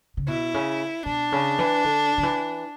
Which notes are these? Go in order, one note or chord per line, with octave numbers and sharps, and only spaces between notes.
C#3
B2 E4
C#3
B2 D4
C#3
E3
D3
D3
E3